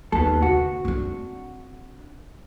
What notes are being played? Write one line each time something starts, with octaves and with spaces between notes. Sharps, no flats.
D#2 B3 A4
D3 F#4
C4 D4